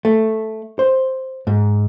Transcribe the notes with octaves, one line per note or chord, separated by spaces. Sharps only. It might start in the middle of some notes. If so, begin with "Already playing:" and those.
A3
C5
G#2